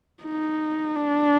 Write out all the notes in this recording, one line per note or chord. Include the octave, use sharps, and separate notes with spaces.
D#4
D4